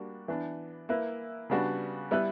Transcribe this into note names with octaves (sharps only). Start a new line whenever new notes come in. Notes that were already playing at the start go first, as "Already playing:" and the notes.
Already playing: G3 A#3 D4 F#4
E3 B3 D4
A#3 E4 B4
C#3 G3 B3 D4 F#4
G3 B3 E4 B4